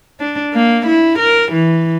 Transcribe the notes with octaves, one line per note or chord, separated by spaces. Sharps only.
D4
A#3
E4
A#4
E3